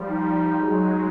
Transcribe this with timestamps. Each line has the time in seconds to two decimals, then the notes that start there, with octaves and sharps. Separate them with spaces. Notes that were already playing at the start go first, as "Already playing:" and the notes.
Already playing: F3 G3
0.09 D#4
0.56 F#3 G#3